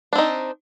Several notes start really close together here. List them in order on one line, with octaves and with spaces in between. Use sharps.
D4 C4 D#4